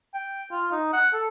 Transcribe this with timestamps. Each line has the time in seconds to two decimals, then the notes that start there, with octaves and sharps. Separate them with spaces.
0.14 G5
0.52 F4
0.72 D#4
0.93 F#5
1.13 A4